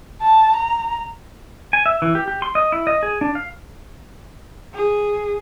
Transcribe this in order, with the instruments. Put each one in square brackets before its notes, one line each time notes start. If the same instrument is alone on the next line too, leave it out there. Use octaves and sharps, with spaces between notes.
[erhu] A5
A#5
[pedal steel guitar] G#5
E5
E3
G4
G4
C6
D#5
E4
D#5
G#4
D4
F5
[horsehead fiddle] G#4